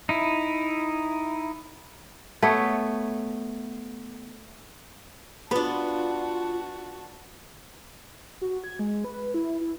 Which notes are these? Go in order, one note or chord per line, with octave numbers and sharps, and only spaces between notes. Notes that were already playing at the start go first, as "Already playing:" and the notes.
D#4 E4
A3 B3 A4 C#5
B3 D4 F4 F#4 B4 A5
F#4
G#6
G#3
B4
E4
E4